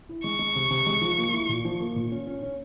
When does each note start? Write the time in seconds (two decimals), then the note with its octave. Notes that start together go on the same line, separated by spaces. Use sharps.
0.09 E4
0.24 G#3 C#6
0.39 G#3
0.55 C3
0.70 C3
0.87 G#3
1.01 F3
1.18 A#3
1.33 E4
1.49 A#2
1.65 F3
1.80 A#3
1.96 A#2
2.11 C#4
2.27 C#4
2.43 C#4